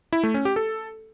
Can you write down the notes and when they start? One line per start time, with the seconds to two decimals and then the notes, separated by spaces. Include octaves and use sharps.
0.13 E4
0.23 A3
0.34 C#4
0.45 G4
0.56 A4